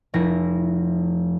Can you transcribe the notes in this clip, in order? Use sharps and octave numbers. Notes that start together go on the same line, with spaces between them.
F1 E4 A#6